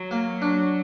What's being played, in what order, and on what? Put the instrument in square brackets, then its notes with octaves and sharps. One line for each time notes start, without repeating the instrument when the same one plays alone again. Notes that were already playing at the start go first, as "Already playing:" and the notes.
Already playing: [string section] F#3
[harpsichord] A#3
D4